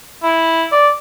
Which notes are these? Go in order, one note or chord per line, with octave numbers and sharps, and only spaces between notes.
E4
D5